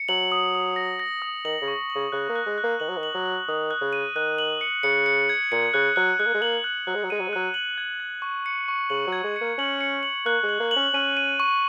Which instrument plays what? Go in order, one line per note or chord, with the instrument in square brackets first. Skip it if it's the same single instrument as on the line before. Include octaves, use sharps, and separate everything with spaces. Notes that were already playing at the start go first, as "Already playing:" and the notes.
Already playing: [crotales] C#7
[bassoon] F#3 [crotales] F#7
[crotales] D#6
D#6
A#6
A#6
D#6
[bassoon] D#3 [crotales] F#7
[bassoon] C#3
[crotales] C#6
F#7
[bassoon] C#3
[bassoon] C#3 [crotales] F#6
[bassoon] A#3
[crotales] F#6
[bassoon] G#3
[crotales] F#6
[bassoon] A#3
[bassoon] D#3 [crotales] F#7
[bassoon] F#3
D#3
[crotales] F#7
[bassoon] F#3
[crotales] F#7
[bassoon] D#3 [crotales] D#6
[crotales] F#6
[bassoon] C#3
[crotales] D#7
[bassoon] D#3 [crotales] F#6
[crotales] F#7
C#7
[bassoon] C#3 [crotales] C#7
[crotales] C#7
G#6
[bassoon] A#2 [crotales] C#7
[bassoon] C#3 [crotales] F#6
[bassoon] F#3 [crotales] F#6
[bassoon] G#3 [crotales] F#6
[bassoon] A#3
G#3
[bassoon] A#3 [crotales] F#7
[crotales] F#6
[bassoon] F#3 [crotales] F#6
[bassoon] G#3
F#3
[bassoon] G#3 [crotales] D#7
[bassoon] F#3
G#3
[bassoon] F#3 [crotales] F#6
[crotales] F#7
G#6
G#6
C#6
C#7
C#6
[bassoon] C#3 [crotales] F#7
[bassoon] F#3
[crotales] G#6
[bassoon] G#3
[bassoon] A#3 [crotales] C#7
[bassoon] C#4 [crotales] F#7
[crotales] C#7
F#7
[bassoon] A#3 [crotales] F#6
[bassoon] G#3
[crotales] F#7
[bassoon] A#3
[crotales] F#7
[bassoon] C#4
[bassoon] C#4 [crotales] D#7
[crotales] D#7
C#6